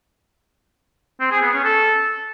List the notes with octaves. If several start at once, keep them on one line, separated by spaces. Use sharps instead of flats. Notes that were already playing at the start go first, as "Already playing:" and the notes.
C4
G#4
B3
C#4
A4